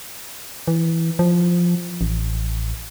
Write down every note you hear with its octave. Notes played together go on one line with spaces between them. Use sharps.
E3
F3
A1